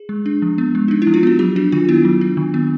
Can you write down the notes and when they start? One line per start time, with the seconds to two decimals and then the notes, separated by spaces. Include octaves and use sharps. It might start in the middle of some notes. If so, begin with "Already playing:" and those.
Already playing: G#4
0.09 G#3
0.26 D4
0.42 F3
0.58 B3
0.75 G#3
0.88 D4 D#4
1.02 E4
1.07 F3
1.14 F4
1.23 B3 F#4
1.39 F#3 G4
1.56 D4 F#4
1.72 D#3 F4
1.89 B3 E4
2.05 F#3
2.21 D4
2.37 D#3
2.54 B3